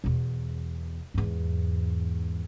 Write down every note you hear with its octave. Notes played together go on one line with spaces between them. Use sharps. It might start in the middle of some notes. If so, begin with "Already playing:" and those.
E2 B2
E2 G#2